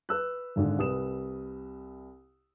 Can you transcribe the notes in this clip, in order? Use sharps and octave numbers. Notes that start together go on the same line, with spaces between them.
B4 E6 F#6
G#1 G#2 D3
C2 B4 D#6 E7